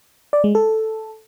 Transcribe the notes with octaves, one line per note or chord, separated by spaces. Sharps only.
D5
G#3
A4